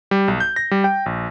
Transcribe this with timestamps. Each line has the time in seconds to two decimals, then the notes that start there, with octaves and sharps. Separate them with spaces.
0.11 G3
0.28 B1
0.40 G6
0.56 A#6
0.71 G3
0.84 G5
1.06 A#1